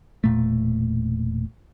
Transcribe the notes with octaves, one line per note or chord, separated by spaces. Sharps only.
E1 A#2 A3